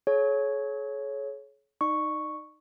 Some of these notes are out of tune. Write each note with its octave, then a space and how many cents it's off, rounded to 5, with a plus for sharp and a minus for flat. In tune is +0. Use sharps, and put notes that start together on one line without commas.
G#4 +45 C#5 +0
D#4 -5 D5 +35 C#6 +0